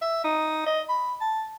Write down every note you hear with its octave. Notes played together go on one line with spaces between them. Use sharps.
E5
D#4
D#5
B5
A5